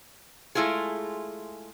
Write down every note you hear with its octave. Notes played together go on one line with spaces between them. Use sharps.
G#3 A3 E4 F4 G#4